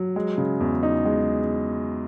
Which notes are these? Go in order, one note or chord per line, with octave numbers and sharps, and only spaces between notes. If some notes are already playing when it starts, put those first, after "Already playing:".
Already playing: F#3
G#3
C#3
E2
D#4
G#3